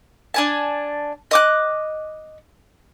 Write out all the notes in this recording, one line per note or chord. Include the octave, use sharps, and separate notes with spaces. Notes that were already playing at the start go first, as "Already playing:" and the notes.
D4 G#5 A5
D#5 D6 F#6